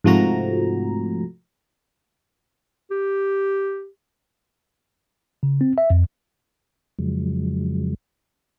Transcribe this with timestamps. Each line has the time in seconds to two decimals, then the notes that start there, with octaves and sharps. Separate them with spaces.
0.04 G#2 C3 F3 A3 F#4 A#5
2.91 G4
5.43 C#3
5.61 C4
5.78 E5
5.90 F2
6.99 F2 C#3 F3 F#3 G#3